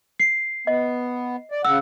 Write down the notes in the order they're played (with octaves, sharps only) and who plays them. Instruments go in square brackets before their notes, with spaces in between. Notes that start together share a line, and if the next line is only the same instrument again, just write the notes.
[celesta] C7
[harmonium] B3 [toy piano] D#5
[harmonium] D5
[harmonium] C#3 F#5 [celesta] E6